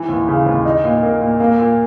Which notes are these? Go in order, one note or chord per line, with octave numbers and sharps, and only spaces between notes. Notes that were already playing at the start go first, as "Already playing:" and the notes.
Already playing: E3
D#2
C#3
D#2
D#4
A#2
A#3
A#2
A#3
A#2